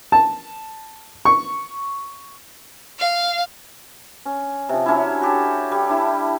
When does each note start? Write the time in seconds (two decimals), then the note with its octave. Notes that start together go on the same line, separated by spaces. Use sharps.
0.12 A5
1.25 C#6
2.99 F5
4.25 C#4
4.69 C3 F3
4.86 F#3 C#4 D4 E4
5.21 F#4 G4 A4
5.72 G3
5.89 D4 E4